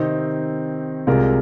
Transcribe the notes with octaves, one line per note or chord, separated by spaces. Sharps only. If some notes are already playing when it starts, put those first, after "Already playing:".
Already playing: C3 D#3 C4 D#4
C2 C3 G#3 F4 A#4